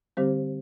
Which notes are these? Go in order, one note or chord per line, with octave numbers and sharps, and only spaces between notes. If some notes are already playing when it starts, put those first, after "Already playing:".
D3 G3 C4 G4 C5